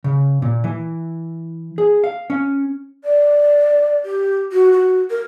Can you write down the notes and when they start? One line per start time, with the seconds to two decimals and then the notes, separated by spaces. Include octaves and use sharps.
0.04 C#3
0.42 A#2
0.64 E3
1.78 G#4
2.04 F5
2.30 C#4
3.03 D5
4.05 G4
4.52 F#4
4.72 F#4
5.10 A#4